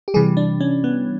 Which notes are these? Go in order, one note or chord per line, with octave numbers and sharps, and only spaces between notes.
G4
C3 E3 G3 G#4
D4
C#4
B3